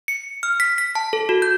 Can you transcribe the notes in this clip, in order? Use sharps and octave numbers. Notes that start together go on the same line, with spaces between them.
C#7
F6
B6
B6
A5
A4
F#4
G6